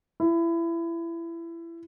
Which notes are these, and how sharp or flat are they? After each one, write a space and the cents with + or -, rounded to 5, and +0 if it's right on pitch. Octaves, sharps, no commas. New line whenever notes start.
E4 +25